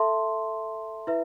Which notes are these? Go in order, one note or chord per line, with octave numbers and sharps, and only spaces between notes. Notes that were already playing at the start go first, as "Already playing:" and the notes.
Already playing: A4 E5 A5 C6
E4 B4 E5